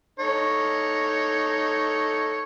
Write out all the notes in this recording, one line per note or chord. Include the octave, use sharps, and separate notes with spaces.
D#4 A4 C#5